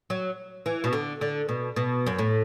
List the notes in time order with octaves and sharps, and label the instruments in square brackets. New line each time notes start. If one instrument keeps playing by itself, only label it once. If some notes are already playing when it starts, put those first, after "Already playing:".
[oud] F#3
E3
B2
D3
D3
B2
B2
F#2
A2